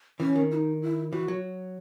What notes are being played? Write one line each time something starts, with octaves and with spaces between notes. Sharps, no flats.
E3 C#4
D#3
E4
D#4
E4
E3 F#4
F#3